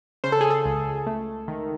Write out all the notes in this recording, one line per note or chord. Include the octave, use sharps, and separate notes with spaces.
C#3 C5
A4
G#4
A4
C#2
A3
D#3